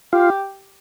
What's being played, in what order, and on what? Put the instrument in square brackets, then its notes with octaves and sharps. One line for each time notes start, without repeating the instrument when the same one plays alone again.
[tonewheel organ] F4 [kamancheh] G4